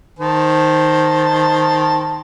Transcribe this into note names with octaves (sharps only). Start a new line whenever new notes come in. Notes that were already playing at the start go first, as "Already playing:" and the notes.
D#3 C5 A5